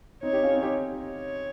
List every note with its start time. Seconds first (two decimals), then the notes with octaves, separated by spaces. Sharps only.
0.23 C4 D#4 C#5
0.33 D#4 G4
0.43 C#4 F4
0.52 C4 D#4
0.63 D#4 G4
1.02 C#5